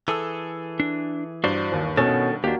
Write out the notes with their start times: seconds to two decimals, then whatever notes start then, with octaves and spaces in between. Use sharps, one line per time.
0.08 E3 G#4 A4 E6
0.80 D4
1.44 G2 F#4 C5 D5
1.72 D#2
1.97 B2 D#3 C#4 F#4 A4
2.44 D#2 A#3 D4 F#4 G4